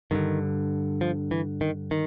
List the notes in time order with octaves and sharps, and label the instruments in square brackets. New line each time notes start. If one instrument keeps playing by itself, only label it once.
[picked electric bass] G2 D3 D#3
F3
E3
D#3
D#3